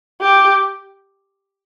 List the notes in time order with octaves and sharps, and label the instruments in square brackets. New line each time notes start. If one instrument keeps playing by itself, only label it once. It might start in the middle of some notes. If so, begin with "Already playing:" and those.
[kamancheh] G4